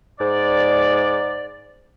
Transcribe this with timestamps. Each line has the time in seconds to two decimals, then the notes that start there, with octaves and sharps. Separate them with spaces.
0.20 G#2 D5